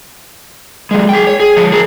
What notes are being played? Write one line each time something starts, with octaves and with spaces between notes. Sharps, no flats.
F#3 G#3
G#4 G5
C#5
G#4
F3 C#5
G#4 A#4